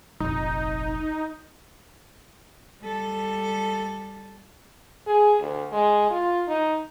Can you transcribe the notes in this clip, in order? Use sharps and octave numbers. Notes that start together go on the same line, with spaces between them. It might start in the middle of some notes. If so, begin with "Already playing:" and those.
F1 A#1 D#4
G3 A4
G#4
D2
G#3
F4
D#4